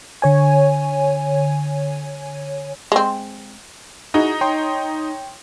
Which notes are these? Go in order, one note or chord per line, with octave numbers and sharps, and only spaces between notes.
D3 C#5 G#5
G#3 C4
D#4 E4 F#4 G#4
C#5 G5 C6